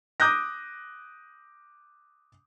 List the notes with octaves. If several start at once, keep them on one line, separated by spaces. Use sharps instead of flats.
D6 D#6 F#6 G6 A#6